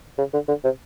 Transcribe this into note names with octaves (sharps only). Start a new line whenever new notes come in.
C#3
D3
D3
C3